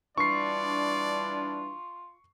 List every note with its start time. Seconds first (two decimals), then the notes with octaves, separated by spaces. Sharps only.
0.18 E3 G3 D4 F4 D5 C#6 C7